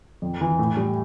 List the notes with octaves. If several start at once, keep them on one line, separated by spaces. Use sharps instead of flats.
F2
E3
A2
G3